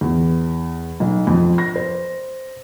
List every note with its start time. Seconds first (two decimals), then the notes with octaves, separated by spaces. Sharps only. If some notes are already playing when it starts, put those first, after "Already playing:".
0.01 E2
1.00 B1
1.27 F2
1.58 A#6
1.76 C5